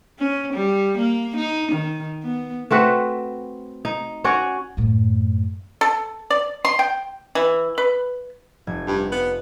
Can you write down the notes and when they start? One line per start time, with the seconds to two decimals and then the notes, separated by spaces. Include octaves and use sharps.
0.18 C#4
0.53 G3
0.98 A#3
1.36 D#4
1.72 D#3
2.23 B3
2.71 A3 C4 F#4 B4
3.85 D#4
4.24 C#4 F#4 C#5 D5
4.77 F#2 A2
5.81 A4
6.30 D5
6.65 C6
6.79 G5
7.35 E3
7.78 B4
8.67 F1 G#6
8.87 G2
9.12 B3